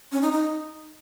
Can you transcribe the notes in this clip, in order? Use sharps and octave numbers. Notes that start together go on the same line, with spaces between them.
C#4
D#4
D#4